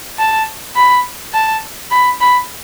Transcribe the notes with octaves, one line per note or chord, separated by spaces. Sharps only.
A5
B5
A5
B5
B5